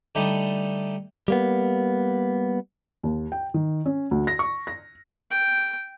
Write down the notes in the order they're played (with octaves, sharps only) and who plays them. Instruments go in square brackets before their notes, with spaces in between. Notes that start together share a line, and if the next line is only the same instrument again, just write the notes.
[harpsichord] D3 G3 A3 D#4 G4
[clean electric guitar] G3 A#3 B3
[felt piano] D#2
G5
D#3
C#4
D2
A#6
C#6
A#6
[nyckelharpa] G5